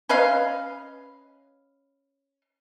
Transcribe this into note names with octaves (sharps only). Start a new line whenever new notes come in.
C#4 B4 D#5 F5